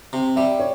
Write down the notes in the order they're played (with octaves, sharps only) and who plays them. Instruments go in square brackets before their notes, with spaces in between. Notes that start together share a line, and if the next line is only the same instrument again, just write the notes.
[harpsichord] C3
[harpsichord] G3 [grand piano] E5
[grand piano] C#5